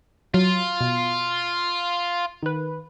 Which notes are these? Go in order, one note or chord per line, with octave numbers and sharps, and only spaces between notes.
F#3 F4
B2
D#3 B4